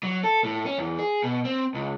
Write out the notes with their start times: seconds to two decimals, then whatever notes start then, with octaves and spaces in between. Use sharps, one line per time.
0.03 F#3
0.24 A4
0.44 A2
0.66 C#4
0.78 E2
0.99 G#4
1.24 B2
1.45 C4
1.74 C#2